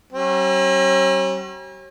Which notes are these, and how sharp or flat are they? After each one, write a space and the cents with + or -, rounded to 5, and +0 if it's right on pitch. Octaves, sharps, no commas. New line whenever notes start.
G3 -45 C#4 -40